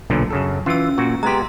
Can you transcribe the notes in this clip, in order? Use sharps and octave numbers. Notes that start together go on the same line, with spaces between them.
B1 A#2 D3
F#2 C#3 A4
E3 C#4 F4 E6
A#2 F#4
G#3 B3 G4 A#5 C6